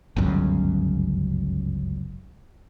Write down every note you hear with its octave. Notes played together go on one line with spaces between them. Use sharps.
G1 C#2 F#2 C#3